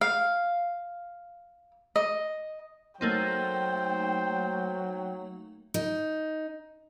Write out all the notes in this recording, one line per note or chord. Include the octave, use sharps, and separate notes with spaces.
F5
D#5
F#3 A3 A#3 D#4 C5 G5
D#4